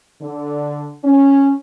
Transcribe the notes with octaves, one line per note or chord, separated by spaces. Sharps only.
D3
C#4